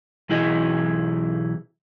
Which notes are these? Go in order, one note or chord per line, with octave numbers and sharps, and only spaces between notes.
B1 E3 E4 G#4 D#5